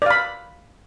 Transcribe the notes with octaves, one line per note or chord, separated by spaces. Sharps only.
D5 F5 B5